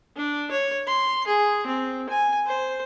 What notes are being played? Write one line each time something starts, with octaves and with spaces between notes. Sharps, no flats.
D4
C#5
C6
G#4
C4
G#5
C5